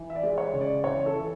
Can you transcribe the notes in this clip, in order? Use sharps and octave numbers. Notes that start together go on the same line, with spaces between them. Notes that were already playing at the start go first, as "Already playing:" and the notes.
Already playing: E3
E5
D5
G#3
C#5
C#3
D5
E3 C#5
A4
E3